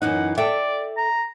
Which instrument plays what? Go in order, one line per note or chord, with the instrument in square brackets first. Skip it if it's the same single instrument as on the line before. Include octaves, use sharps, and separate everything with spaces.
[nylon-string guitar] F#2 E3 D#4 [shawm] F#5
[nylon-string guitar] A4 E5 G5 [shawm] D5
[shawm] A#5